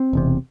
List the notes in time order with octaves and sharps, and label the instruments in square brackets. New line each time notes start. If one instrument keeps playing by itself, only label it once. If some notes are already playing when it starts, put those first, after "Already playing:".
Already playing: [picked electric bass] C4
E1 E2 C3